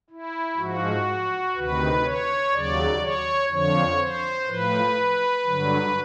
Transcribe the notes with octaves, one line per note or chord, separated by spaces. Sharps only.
E4
G#2 F3 F#4
D2 C3 D#3 B4
C#5
D#2 C#3 F#3 D5
C#5
F2 D3 F3 C#5
C5
A2 F3 B4
G2 D3 F#3